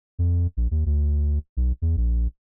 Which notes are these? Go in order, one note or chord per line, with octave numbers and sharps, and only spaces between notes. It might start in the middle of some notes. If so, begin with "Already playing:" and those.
F2
A#1
D#2
D2
B1
E2
A#1